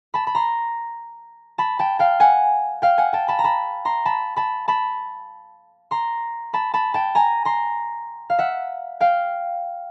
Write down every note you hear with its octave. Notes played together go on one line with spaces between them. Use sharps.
A5 B5
B5
A#5 C6
A5 B5
G5 A5
F5 G5
F#5 G#5
F5 G5
F#5 G#5
G5 A5
A5 B5
A#5
A5 B5
A#5 C6
A5 B5
A5 B5
A5 B5
A#5 C6
A5 B5
A5 B5
G5 A5
G#5 A#5
A#5 C6
F5
E5 F#5
F5 G5